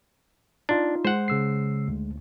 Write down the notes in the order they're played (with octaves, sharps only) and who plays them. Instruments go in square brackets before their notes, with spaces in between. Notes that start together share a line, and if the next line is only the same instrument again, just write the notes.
[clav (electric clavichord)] D4 [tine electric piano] D#4 F4
[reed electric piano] G#3 [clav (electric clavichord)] C5 F#5
[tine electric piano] C#3 E6 C7
D2